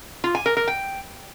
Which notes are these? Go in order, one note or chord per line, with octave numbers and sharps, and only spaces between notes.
F4
G#5
A#4
A#4
G5